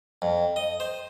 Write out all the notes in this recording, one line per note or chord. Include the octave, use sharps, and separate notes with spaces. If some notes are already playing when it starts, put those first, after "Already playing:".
F2
D#5
C5